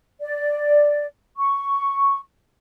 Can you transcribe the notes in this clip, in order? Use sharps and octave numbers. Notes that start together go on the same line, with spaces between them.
D5
C#6